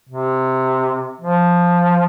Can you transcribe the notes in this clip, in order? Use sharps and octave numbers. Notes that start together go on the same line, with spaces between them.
C3
F3